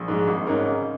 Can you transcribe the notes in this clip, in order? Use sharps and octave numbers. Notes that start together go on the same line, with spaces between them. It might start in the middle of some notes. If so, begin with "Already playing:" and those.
Already playing: A#1
G#2 G#3
G#1
G#2 G#3 C#4 A#4
C#3